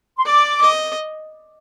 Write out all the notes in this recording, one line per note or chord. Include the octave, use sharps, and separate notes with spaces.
C6
D5 D6
D#5